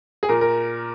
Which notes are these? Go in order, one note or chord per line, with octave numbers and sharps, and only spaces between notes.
G#4
A#2 A#4
A#4